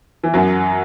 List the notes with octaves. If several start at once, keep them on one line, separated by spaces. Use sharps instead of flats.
E3
F#2 F#3